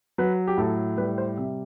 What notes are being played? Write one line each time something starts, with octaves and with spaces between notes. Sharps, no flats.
F#3 B4
G4
A2 A4
G3 B4
C5
C3 E5